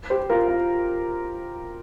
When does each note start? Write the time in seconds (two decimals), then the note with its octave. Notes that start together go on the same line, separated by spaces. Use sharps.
0.10 G4 C5
0.30 F4 A#4
0.48 F4